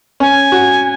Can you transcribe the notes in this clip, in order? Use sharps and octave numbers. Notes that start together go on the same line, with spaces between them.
C#4 G#5
F#4